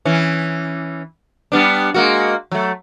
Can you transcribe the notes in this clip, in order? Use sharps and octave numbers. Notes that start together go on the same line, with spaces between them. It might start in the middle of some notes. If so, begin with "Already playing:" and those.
E3 C#4
G3 B3 D4
G#3 A#3 F#4
F#3 A3